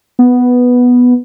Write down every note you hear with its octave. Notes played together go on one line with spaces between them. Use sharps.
B3